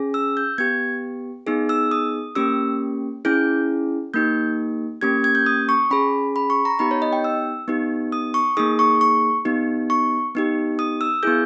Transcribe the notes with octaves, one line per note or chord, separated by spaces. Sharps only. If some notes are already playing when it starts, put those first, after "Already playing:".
Already playing: C#4 G#4
E6
G6
B3 G4 G#6
B3 D#4 G#4
E6
D#6
A#3 C#4 G4 E6
C#4 E4 G#4 G6
A#3 D#4 G4 G6
A#3 C#4 G4 G#6
G#6
G6
D#6
C#6
C#4 G#4 B5
B5
C#6
A#5
B3 D#4 G4 B5
C#5
D#5
G5
E6
B3 D#4 G4
D#6
C#6
A#3 D#4 G#4 D#6
C#6
C#6
B3 D#4 G4
C#6
B3 D#4 G4
D#6
E6
B3 E4 G#4 G6